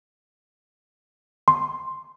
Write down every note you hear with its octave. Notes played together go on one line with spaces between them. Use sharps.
C6